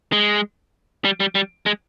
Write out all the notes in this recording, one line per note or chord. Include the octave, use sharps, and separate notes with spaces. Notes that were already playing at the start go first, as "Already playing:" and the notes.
G#3
G3
G3
G3
G#3